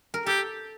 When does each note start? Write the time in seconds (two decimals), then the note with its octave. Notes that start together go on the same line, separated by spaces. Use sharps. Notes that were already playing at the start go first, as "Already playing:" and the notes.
0.14 A#4
0.26 G4 A4